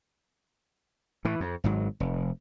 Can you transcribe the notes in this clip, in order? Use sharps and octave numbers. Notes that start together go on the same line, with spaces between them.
A2 E3
F2
G#1 G#2 F#3
F1